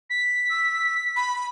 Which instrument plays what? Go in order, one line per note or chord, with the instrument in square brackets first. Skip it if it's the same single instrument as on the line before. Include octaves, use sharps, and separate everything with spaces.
[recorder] B6
[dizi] E6
B5